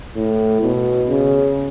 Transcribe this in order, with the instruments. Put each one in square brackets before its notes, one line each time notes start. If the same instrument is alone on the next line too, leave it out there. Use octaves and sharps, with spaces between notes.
[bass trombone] A2
B2
C#3